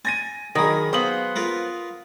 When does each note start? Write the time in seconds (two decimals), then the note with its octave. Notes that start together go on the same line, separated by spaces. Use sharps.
0.05 G#5 A6 A#6 D#7
0.55 D#3 F#3 G#4 A#4 A#5 B5
0.93 B3 C5 F5 D#6 F#7
1.36 F4 A#4 B4